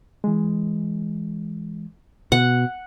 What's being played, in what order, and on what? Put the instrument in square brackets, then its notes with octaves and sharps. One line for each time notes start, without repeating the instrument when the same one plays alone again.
[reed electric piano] E3 G#3
[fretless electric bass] B2 [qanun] F#5